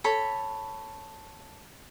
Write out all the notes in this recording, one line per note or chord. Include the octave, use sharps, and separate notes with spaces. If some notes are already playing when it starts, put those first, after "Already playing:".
A4 C#5 B5